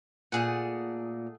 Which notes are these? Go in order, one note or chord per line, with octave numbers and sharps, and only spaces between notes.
A#2 A3 G#4 F#5